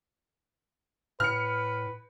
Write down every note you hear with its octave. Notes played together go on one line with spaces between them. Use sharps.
A2 B4 F6 C#7